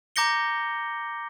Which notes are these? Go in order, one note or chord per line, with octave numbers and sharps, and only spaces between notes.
A#5 D6 G6 A#6 C#7 G7